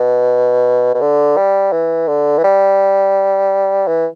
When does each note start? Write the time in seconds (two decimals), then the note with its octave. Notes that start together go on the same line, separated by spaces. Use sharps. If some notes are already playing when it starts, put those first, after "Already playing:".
Already playing: B2
0.95 B2
1.01 D3
1.37 G3
1.72 E3
2.08 D3
2.38 E3
2.44 G3
3.87 E3